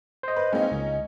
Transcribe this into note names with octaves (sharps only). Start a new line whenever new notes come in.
C5 D#5
B4
G#3 A#3 C4 C#4 D#4
C#2